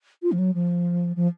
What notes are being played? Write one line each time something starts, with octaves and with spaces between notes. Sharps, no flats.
F4
F3
F#3
F3
F3